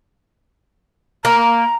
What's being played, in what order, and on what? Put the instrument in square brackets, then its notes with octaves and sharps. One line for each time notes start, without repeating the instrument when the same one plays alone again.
[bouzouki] A#3 [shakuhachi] A#5